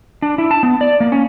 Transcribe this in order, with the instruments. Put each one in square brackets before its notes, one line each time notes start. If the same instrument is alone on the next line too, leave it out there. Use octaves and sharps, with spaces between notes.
[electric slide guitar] D4
E4
A5
B3
D5
A#3
C#4